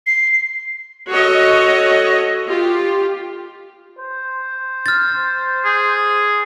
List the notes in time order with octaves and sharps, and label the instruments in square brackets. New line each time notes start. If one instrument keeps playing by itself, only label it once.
[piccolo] C7
[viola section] F#4 A4 C#5 D#5
F4 G4
[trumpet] C5
[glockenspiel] F6 A6
[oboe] G#4